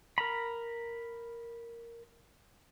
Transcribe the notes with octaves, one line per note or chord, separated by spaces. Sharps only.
A#4 A#5 B5